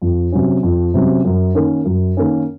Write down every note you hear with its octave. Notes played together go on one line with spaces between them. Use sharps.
F2
C3 F#3 C#4
F2
C3 F#3 C#4
F#2
D#3 A#3 C#4
F#2
D#3 A#3 C#4